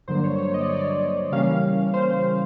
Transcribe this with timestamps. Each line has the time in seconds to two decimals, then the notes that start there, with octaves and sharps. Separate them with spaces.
0.08 G2 D3 F#3 A#3 C5
0.24 C#5
0.38 C#5
0.54 D#5
0.61 D5
0.69 C#5
0.76 D5
1.31 C#3 E3 G3 A#3 C#4 F5
1.94 C5